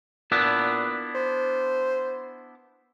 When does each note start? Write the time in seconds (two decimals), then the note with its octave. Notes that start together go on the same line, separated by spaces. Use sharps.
0.32 A#2 B3 D4 E4
1.15 C5